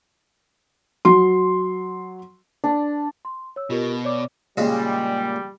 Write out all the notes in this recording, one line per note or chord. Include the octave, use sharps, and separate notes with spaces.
F#3 C6
D4
C6
C#5 E6
B2 F4 G4 A#4
C#5 D5 D6
A#2 C#3 G3 G#3